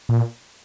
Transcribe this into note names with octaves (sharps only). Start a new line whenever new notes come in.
A#2